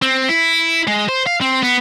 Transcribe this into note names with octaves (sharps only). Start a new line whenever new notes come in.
C4
E4
G#3
C5
F5
C4
B3